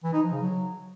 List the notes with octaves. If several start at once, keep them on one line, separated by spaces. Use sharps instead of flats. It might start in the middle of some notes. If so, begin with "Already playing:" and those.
E3
D#4
F3
C#3
F#3